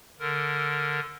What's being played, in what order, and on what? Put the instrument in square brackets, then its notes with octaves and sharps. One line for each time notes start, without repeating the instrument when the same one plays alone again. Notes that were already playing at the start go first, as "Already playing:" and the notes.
[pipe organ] D3 A#4